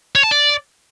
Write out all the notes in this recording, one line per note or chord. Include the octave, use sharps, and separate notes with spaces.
C#5
A5
D5